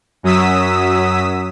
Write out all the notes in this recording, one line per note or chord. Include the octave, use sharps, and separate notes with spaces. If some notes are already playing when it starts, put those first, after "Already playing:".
F#2 F#3 D#6 E6 B6